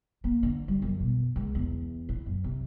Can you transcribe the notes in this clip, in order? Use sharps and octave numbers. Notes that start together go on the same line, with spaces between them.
A#3
D3
G3
F#2
B2
C#2
E2
A2
F#2
C3